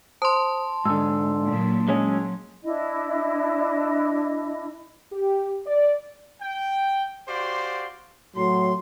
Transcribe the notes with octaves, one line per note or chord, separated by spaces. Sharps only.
C5 A5 C6 D#6
G#2 D3 E6
A#2 F#3 D4
F#3 G#3 C#4
D4 E4 D#5
G4
D5
G5
F#4 G4 C5 D5 F5 C6
A2 F#3 C6